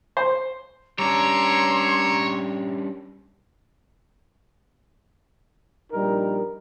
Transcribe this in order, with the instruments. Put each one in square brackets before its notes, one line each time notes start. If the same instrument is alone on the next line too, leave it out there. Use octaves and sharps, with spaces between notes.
[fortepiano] C5
[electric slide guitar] G3 C#4 D4 [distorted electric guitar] C#5 [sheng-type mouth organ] A#5 D6 E6 [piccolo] C6
[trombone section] A#1 G3 D#4 A#4